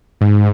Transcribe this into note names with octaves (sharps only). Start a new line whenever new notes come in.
G#2